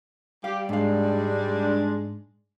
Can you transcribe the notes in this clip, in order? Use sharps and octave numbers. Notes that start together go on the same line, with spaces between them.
G3 G4 F5
G#2 G#3 D4 F5